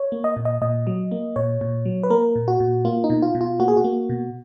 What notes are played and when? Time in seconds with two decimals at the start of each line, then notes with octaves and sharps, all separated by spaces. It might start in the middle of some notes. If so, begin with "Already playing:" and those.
Already playing: C#5
0.12 A#3
0.24 D#5
0.37 A#2
0.45 D#5
0.62 A#2 D#5
0.87 F#3
1.12 A#3
1.36 A#2 C#5
1.61 A#2
1.86 F#3
2.03 B4
2.10 A#3 A#4
2.36 A#2
2.48 F#4
2.60 A#2
2.85 A#3 F4
3.04 D#4
3.10 B2
3.22 F4
3.35 B2
3.41 F4
3.60 A#3 F#4
3.68 G#4
3.77 F#4
3.84 A#3
4.10 B2